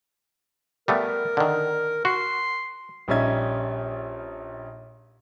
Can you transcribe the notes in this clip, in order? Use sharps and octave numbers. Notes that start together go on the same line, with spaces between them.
G3 A3 B3 A#4
D3 D#3
F#4 C6
A#1 G3 C#4 D#4 E5 G#6